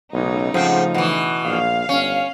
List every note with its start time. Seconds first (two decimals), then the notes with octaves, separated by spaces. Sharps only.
0.13 B1 C#3 A3 D#4
0.54 G#2 F3 C4
0.94 B2 E3
1.45 A#1 F5
1.89 G1 C#4